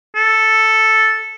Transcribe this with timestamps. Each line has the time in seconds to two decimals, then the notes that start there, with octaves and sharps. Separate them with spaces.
0.15 A4